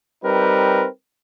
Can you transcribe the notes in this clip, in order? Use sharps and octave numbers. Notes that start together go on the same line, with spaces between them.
G3 C4 D#4 A#4 B4